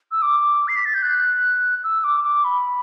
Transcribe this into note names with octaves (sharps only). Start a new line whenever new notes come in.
E6
D6
C7
B6
A6
G6
F#6
E6
D6
D6
B5